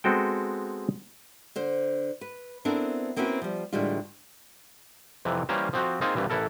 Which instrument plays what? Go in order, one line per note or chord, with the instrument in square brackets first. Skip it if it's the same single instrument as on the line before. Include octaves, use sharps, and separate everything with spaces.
[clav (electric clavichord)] G#3 B3 C4 F#4 A4 G5
[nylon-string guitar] D3 C5
B4
B3 C4 D4 E4 A4 A#4
A#3 C4 C#4 E4 F#4 B4
F3 G3
A2 D3 E3 G3 G#3 F4
[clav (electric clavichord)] F2 C3 E3
E3 G3 A#3 C#4 A#4 C5
F3 C4 F#4
A#3 C4 D#4 F4 G#4 C5
C2 G2 E3 G3
A1 E3 E4 A4 A#4